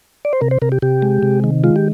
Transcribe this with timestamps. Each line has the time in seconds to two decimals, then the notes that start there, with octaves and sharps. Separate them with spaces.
0.25 D5
0.33 C5
0.41 C3 A#4
0.51 C5
0.62 C3 A#4
0.72 G4
0.82 C3 G4
1.02 G#3
1.23 C3
1.44 D#3
1.64 G#3 F4
1.76 G4